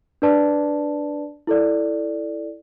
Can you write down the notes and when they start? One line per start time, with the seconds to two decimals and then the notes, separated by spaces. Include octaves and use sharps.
0.22 D4 B4 D5 A5
1.47 E4 A4 D5